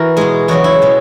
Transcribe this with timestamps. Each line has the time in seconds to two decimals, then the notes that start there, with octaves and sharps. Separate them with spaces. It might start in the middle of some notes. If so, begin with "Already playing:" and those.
Already playing: E3 E4 F#4 A#4
0.17 B2 G#3 G#4
0.48 E2 C#3 F#3 F#4
0.64 E4
0.82 B2 G#3